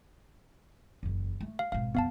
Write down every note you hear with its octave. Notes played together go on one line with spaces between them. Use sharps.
F#1 E2
A3
F5
G#1 B2 F5
C2 F2 B3 F5 A5